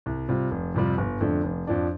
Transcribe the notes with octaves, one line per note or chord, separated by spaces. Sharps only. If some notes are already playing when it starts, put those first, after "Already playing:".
C2
C3 G3 F4
F1
F2 C3 G3 F4
G1
F2 D3 A3 D4
F1
F2 F3 D4